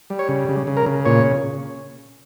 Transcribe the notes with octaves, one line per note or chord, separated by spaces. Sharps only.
G3
C#5
C#3
C#3
C#3
A#4
C#3
A#2 C#5